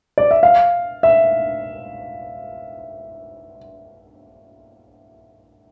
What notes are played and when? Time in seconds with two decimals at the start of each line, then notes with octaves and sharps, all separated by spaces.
0.18 D5
0.31 E5
0.43 F5
1.03 E5